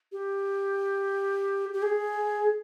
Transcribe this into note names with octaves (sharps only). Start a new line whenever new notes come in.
G4
G4
G#4